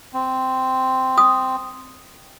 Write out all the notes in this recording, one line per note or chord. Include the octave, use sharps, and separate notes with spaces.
C4
D#6